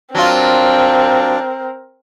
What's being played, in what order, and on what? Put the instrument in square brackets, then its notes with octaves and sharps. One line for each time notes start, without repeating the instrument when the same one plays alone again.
[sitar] F#3 F4 [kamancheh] C4 A#4 [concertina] D4